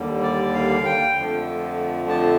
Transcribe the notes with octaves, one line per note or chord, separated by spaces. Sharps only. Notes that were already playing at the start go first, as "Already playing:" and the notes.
Already playing: D#2 D3 G3
D5
F5
G5
F2 D3 F3 A3
A5